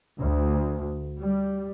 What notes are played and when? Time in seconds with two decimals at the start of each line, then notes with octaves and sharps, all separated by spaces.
0.20 D2
1.20 G3